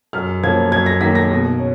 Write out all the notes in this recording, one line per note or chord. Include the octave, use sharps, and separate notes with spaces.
F#2 F6
F3 A#3 C#4 G#6
F#2 G#6
A#6
D#3 F#3 A#3 B6
A#6
B2
C#4